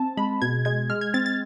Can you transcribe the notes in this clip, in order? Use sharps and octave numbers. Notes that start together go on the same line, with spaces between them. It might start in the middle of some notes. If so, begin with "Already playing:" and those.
Already playing: C4 A5
G#3 B5
B2 G#6
G#3 G#6
G#3 F6
G#6
C4 A6
A6